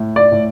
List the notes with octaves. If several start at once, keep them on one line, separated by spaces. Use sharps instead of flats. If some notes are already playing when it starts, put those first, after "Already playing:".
Already playing: A2
D5
A2